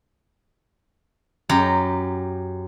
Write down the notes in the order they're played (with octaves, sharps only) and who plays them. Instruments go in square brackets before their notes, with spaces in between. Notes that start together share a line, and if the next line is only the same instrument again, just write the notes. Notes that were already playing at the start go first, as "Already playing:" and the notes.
[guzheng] F#2 G4 A#5